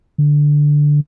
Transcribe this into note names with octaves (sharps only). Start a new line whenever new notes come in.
D3